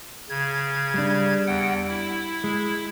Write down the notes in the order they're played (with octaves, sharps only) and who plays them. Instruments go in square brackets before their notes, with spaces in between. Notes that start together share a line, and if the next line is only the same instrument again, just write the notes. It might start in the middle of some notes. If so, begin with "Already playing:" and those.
[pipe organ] C#3 G#6
[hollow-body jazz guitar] G3 D4
[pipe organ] E2 F#5 G5
E4
[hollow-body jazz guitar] G#3